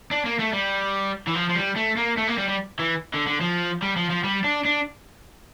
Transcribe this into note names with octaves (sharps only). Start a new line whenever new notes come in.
D4
A#3
A3
G3
E3
F3
F3
G3
A3
A#3
A3
A#3
G3
G3
E3
D3
D3
F3
G3
F3
F3
G3
D4
D4